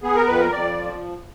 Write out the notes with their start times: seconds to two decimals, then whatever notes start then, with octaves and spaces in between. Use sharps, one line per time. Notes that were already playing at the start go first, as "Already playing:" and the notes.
0.03 B3 G#4
0.15 A#4
0.27 F2 B4
0.40 A#4
0.52 F2 D5
0.77 F3